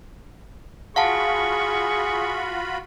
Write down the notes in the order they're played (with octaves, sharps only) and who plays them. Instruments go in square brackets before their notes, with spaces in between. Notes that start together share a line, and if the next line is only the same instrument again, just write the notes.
[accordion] F4 F#4 B5 [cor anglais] G#4 [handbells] F5 F#5 A5 [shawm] C#6